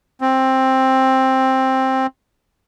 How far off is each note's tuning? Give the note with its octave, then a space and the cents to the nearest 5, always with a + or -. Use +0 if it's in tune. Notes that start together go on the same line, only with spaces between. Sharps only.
C4 +10